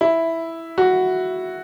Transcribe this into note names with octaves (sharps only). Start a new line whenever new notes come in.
E4
F#4